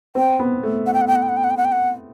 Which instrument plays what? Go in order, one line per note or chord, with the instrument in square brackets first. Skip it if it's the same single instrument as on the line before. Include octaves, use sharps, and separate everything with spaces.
[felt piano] C4 [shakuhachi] G5
[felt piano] B3
A3
[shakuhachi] F#5
G5
F#5
G5
F#5
G5
F#5
G5
F#5
G5
F#5
G5
F#5